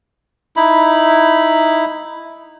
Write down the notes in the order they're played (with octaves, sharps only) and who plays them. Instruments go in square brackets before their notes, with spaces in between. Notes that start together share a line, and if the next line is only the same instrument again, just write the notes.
[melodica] D#4 E4 B5